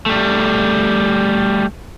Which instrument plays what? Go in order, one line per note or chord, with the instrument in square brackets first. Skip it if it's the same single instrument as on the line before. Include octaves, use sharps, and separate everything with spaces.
[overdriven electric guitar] G3 A3